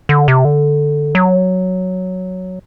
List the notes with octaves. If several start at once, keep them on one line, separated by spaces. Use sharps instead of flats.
D3
C3
D3
F#3